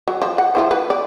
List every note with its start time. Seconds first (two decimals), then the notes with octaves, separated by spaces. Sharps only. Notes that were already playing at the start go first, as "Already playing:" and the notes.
0.08 F#3
0.22 F3
0.38 F#5
0.55 F3 E4 C5
0.71 B4
0.90 D5